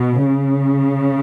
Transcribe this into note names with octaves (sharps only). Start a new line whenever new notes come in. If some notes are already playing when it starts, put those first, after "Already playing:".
Already playing: B2
C#3